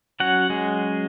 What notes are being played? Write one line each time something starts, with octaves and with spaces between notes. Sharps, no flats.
F#3 C#4 F#4 F#5
G#3 G#4